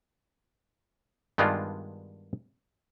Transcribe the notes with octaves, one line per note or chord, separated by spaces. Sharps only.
G2 D#3 G#3 B3 D4 F4